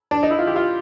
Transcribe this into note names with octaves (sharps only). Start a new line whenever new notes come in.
D4
D#4
E4
F4
G4
F4